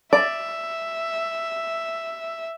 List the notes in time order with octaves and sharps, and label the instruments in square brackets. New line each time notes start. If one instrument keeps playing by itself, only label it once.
[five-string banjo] D5 [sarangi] E5